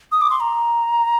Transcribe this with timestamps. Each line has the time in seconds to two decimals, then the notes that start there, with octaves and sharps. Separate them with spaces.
0.12 D#6
0.21 D6
0.30 C6
0.40 A#5